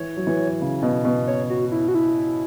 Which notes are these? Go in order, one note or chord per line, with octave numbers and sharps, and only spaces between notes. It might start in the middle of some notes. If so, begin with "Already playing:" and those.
Already playing: E3 C#5
F#3
E3
C#3
B2
B2
C#5
F#4
E4
F#4
E4